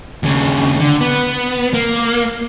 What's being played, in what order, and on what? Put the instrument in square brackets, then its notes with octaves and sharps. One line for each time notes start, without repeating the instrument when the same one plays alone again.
[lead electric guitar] D#2 C#3
D3
B3
A#3